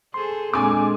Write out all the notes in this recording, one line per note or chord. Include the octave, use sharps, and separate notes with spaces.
G#4 A4 C5 C6
A#2 G#3 C4 D4 A4 G#5 D6